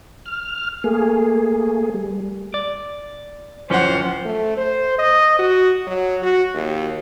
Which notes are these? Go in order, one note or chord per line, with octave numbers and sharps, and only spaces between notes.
F6
A3 A#3 G#4
G3
D5
D1 F#2 F3 C#4 C5 F#5
A3
C5
D#5
F#4
F#3
F#4
D#2